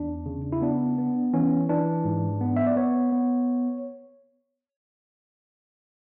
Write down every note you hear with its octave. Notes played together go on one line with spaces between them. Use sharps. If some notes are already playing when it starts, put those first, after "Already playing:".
Already playing: E2 D4
C#3
E4
B3 D4
B3
E3 C#4
E3 D4
G#2
B3
E5
D5
B3 C#5
B3